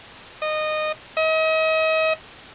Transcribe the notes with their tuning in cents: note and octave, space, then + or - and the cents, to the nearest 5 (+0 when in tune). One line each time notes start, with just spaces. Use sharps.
D#5 -15
D#5 +40